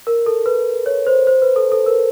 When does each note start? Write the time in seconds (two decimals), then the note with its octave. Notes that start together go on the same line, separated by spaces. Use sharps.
0.07 A#4
0.26 A4
0.46 B4
0.86 C#5
1.07 C5
1.27 C5
1.42 B4
1.56 A4
1.72 A4
1.86 A#4